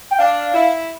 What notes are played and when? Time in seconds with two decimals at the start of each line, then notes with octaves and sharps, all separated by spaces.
0.11 G5
0.19 D4 F5
0.54 E4